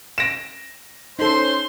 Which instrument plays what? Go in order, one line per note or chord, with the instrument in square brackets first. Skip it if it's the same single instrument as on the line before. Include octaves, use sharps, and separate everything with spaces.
[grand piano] A#6 D7 E7
[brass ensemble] C#4 C5 [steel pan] D#4 A4 [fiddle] C6